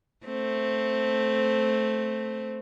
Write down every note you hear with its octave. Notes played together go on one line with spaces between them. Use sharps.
A3 C4